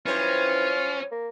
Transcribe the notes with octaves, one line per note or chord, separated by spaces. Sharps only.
G2 E3 F#3 C#4 F4 C5
A#3